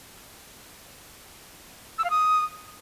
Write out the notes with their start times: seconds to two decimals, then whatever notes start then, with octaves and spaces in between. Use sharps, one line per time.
1.98 E6
2.04 F5
2.10 D#6